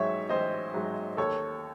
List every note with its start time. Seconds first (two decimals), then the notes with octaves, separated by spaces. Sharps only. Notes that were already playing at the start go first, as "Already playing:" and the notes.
Already playing: A1 G#2 F#3 C#5 E5
0.29 A1 C5 D#5
0.74 G#2 F#3
1.17 D#2 A4 C#5